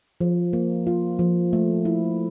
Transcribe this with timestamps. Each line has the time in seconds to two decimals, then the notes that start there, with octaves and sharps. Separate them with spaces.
0.21 F3
0.53 A#3
0.87 F4
1.19 F3
1.53 A3
1.85 E4